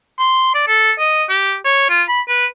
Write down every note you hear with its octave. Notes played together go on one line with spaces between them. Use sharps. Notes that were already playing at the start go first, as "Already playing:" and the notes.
C6
D5
A4
D#5
G4
C#5
F4
B5
B4